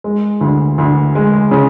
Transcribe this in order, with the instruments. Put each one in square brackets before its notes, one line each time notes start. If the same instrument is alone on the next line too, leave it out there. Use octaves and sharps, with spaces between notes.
[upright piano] G#3
D2
D2
G#3
C#3